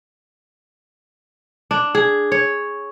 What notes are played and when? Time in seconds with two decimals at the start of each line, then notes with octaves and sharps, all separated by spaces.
1.71 D4
1.95 G#4
2.32 C#5